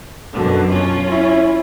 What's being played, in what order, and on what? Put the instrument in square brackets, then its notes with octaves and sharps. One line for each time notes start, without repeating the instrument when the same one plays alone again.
[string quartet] F#2 B2 D3
C#4 F4
[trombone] E4